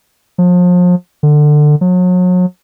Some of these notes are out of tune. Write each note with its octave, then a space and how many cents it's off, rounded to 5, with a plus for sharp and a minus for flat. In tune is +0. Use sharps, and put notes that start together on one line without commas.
F3 +35
D3 +20
F#3 -35